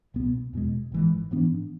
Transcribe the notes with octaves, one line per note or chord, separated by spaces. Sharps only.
C2 B2 B3
E2 B2 G#3
G#1 G#2 E3 G#3
G#2 E3 B3 D4